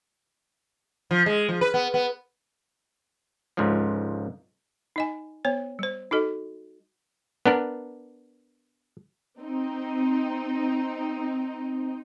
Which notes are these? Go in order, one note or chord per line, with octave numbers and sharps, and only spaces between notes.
F3
G#3
F3
B4
B3
B3
C#2 G#2 D3 F3
D#4 D#5 G#5
B3 C5 C#5
G3 C5
D#4 F#4 A4 D#5
B3 D4 A#4
C4 D#4